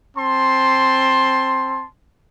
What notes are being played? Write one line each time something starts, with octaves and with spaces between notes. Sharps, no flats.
C4 A5 C6